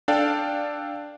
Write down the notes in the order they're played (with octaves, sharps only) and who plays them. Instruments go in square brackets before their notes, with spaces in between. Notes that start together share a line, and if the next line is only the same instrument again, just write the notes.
[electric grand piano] D4 A4 D5 F5 G5